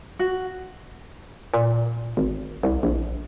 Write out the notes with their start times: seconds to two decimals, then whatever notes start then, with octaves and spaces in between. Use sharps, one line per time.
0.19 F#4
1.54 A#2
2.17 G#1
2.63 C2
2.83 A#1